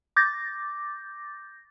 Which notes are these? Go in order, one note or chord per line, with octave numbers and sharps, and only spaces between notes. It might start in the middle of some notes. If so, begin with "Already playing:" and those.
D6 G6 A6 A#6